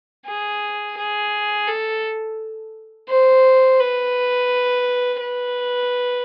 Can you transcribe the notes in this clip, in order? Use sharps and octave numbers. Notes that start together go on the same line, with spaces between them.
G#4
G#4
A4
C5
B4
B4